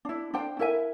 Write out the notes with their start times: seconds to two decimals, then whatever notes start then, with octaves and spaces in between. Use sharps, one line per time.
0.05 D4 E4
0.34 D4 C5 G5
0.59 E4 A#4 E5 G#5